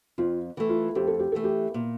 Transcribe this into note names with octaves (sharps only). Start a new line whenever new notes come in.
F2 F4
E3 A3
F4
F2 G4
A4
G4
E3 A3 A4
G4
A#2